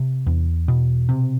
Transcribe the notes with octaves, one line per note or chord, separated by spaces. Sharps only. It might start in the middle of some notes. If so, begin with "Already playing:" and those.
Already playing: C3
E2
B2
C3